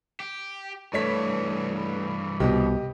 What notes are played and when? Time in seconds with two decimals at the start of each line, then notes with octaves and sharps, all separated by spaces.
0.20 G4
0.93 G2 E3 A3 C#5 B6
2.40 C2 B2 G4 D#5